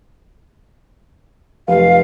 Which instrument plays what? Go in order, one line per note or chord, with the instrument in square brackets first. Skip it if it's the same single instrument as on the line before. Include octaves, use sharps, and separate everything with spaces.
[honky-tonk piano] F1 [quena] F5